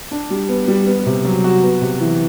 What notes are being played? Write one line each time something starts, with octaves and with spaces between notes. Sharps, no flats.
D4
G3
B3
G3
B3
C3
F#3
F#4
B3
C3
E3